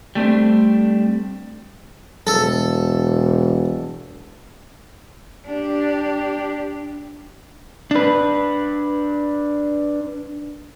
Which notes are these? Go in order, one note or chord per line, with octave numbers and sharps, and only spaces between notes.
G3 A3 C4 D4
E1 A4
D4 G4
D4 B4